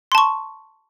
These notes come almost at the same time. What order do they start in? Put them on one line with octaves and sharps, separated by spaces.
C6 A5 C#6